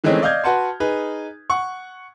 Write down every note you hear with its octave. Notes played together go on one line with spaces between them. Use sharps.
D#3 E3 G#3 A3 C4 C#4
D5 D#5 F5 F6 G6 G#6
F#4 B4 F#5 A5 C6
D#4 G#4 B4
F#5 C#6